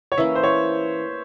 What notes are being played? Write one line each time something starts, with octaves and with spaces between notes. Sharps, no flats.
C#5
E3 A#3 C#4 E5
C5
C#5